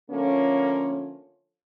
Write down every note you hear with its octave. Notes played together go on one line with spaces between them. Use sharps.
D3 F3 A3 A#3 C#4